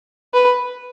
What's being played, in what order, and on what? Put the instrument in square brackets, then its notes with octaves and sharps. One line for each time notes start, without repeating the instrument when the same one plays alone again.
[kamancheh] B4